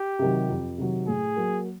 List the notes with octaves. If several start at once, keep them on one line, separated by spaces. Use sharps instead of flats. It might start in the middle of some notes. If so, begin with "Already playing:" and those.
Already playing: G4
C3 D#3 F#3
F2
C3 D#3 F#3
A2 G#4
F#3 A#3